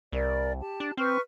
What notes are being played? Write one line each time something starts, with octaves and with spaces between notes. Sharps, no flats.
C2 A#4 D5
G4 A5
D4
C4 B4 C#6 F6